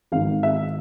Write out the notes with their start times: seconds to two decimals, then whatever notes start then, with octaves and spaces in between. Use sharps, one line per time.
0.12 G#1 G#2 D#3 F5
0.43 E5